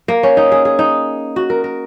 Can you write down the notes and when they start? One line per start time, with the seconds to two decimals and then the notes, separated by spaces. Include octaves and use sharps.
0.08 A#3
0.23 C#4
0.37 D#4
0.52 G#4
0.65 G#4
0.79 D#4
1.36 F#4
1.50 A#4
1.64 A#4